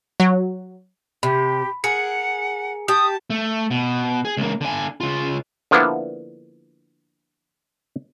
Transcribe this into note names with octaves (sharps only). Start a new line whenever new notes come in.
F#3
C3 G4 B5
G#4 A#4 F#5 C#7
G4 A5 D#6
A3
B2
G#4
C#2 A#3
D3 G#5
C#3 F4
D3 F3 A#3 B3 D4 E4